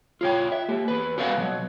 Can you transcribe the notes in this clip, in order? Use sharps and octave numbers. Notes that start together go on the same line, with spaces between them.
F4 C#5 G5
E5
A#3 G4
E2 B4
F#4 B4 D5 E5 F5
B2 F#3